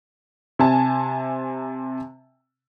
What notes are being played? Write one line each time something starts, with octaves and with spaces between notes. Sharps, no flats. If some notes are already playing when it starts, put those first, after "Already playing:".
C3 G#5 A5